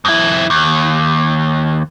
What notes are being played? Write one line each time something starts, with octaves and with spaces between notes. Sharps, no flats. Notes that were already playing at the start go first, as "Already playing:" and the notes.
F2 E4
D#2